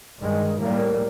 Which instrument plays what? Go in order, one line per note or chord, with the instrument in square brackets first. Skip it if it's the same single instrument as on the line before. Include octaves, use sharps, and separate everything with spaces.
[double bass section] G2 D#3 G#3
A2 G3 A#3